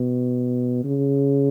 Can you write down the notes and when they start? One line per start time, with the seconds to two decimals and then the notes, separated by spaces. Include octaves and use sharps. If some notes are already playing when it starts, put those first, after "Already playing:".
Already playing: B2
0.84 C#3